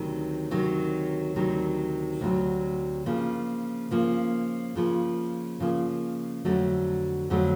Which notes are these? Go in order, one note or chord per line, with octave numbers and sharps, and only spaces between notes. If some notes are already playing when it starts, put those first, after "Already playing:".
Already playing: D2 C3 D#3 F#3
D2 C3 D#3 F#3
D2 C3 D#3 F#3
D2 C3 D#3 F#3
C#3 F3 A#3
C#3 F3 A#3
C#3 F3 A#3
C#3 F3 A#3
F2 D3 F#3 A3
F2 D3 F#3 A3